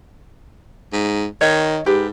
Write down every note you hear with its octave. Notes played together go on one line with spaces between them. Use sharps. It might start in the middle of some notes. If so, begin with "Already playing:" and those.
G#2
D#3 C#5 D#5
G#2 G4 B4